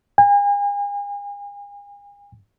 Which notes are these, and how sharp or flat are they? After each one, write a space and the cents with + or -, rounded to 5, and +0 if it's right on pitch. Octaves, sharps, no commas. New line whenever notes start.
G#5 -40